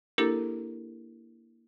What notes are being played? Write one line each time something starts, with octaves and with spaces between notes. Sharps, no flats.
A#3 D4 E4 G4 A4 A#4